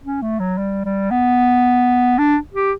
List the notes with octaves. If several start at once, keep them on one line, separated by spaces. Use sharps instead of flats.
C#4
A3
F#3
G3
G3
B3
D4
G4